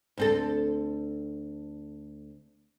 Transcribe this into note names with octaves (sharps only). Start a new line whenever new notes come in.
D2 C4 A4